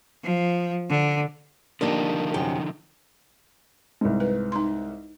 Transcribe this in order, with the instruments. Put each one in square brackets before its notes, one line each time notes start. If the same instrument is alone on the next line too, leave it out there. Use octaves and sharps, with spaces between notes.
[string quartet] F3
D3
[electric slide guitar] D3 F3 D#4 [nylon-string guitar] A#3 D4 G4
[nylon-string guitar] F#2 C3 G5
[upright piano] C2 G#2
[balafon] B4
D#4 C6